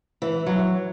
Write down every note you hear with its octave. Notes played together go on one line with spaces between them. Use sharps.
E3
F#3